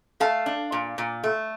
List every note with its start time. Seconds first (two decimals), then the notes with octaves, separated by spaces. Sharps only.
0.20 A3 F5 A5
0.46 D4
0.72 A#2
0.98 A#2
1.24 A3